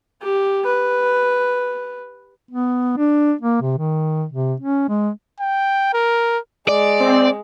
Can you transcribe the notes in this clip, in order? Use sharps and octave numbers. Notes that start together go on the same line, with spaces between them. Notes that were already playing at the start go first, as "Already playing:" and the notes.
G4
B4
B3
D4
A#3
C3
D#3
C3
C#4
G#3
G5
A#4
G#3 D5
C4